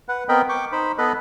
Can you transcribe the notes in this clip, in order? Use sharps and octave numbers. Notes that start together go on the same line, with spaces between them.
B4 F#5
B3 C4 A#4 D#5 G5 B5
G5 C#6 D6
D#4 C5 B5
B3 A4 B4 D#5 B5